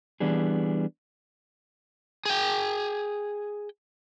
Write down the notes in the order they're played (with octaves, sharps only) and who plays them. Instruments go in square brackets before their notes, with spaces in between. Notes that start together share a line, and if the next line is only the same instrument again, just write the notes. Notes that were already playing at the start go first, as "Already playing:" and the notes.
[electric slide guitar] E3 G3 B3 D4 G#4
[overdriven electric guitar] G#4 G5